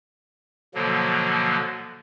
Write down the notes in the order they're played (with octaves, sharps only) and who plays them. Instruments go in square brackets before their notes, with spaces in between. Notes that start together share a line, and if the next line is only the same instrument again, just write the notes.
[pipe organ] B2 D3 F3 F#3 A#3